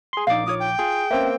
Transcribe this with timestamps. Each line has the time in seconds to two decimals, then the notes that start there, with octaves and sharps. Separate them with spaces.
0.13 G#4 C6
0.27 A#1 D#4 D5 F5 D6
0.46 D#4 F4 C#5 D#6
0.60 G5
0.79 F4 G#4
1.11 A#3 C4 C#4 B4 E5